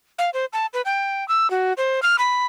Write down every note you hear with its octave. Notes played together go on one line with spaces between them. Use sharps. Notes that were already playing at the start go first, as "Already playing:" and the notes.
F5
C5
A5
B4
G5
E6
F#4
C5
F6
B5